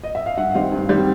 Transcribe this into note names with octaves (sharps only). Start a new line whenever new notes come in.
D#5
E5
F5
G2 E5 F#5
D#3 G3 C4 D#5 F5
G2
D#3 G3 C4